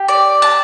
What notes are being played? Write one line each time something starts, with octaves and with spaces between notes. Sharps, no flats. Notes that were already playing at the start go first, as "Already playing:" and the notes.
Already playing: G4
D5
A5